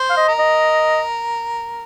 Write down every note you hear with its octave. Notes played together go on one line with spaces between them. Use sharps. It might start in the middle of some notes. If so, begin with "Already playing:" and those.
Already playing: C5
F5
D#5
A#4
D#5